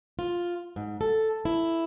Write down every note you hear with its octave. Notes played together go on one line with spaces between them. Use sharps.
F4
G#2
A4
E4